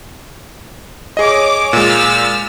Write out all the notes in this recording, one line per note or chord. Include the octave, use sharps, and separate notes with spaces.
G#4 C#5 D#5 D6
A#2 G#3 E6 F6 A6